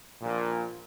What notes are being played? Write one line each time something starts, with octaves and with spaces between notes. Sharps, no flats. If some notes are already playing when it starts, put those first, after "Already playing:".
A#1 A#2